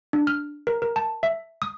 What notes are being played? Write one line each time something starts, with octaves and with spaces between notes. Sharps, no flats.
D4
F6
A#4
A#4
A5
E5
D#6